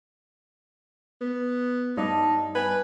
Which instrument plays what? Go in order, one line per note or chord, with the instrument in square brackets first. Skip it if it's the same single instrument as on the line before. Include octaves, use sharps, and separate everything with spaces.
[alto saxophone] B3
[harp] G2 [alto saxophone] D#4
[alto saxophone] B4 [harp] G#5